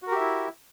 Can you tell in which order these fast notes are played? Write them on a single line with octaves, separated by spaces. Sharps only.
F#4 A#4 G4 E5 E4